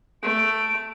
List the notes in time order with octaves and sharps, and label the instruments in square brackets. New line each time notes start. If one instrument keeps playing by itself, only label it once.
[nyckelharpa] A3 [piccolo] D7